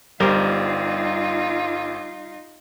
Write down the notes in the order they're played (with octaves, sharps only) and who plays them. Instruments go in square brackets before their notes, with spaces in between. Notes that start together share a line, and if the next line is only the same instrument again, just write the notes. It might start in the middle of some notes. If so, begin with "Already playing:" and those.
[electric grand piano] G1 [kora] G3 A#4 C5 [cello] D#4 F4